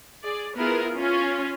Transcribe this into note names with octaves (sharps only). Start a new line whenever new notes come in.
G#4 D5
B3 E4 F4 G#4 A#4
C#4 F4